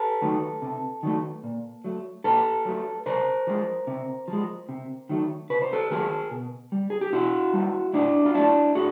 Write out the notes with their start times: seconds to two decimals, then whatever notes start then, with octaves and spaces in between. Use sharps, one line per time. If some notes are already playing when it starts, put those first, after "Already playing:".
Already playing: A4 B4
0.22 D#3 F#3 A3
0.62 C3
1.03 D#3 F#3 A3
1.44 A#2
1.84 F#3 A3
2.24 A#2 A4 B4
2.65 F#3 A3
3.06 C3 A#4 C5
3.47 F3 G#3
3.87 C3
4.28 F3 G#3
4.69 C3
5.09 D#3 F#3 A3
5.50 C3 B4
5.62 C5
5.73 A4 B4
5.91 D#3 F#3 A3 G#4 A#4
6.31 B2
6.72 G3
6.90 G#4
7.01 G4
7.13 B2 E4 F#4
7.53 G3
7.93 A2 D4 E4
8.26 F4
8.34 F#3 A3 D4 E4
8.75 A2 F#4 G#4